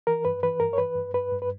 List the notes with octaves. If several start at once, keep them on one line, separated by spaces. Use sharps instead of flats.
E3 A#4
G2 B4
E3 B4
G2 A#4
C#5
E3 B4
G2
G2 B4
G2
B4